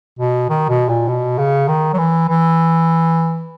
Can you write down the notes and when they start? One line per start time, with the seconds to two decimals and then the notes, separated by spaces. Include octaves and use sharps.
0.19 B2
0.49 D#3
0.69 B2
0.89 A#2
1.08 B2
1.39 C#3
1.68 D#3
1.93 F#3
1.98 E3
2.29 E3